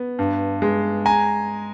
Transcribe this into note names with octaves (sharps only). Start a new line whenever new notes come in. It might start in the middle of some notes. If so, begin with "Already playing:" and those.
Already playing: B3
G2
G#3
G#5 A#5